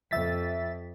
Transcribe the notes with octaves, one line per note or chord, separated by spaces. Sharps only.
F2 E5 A6 B6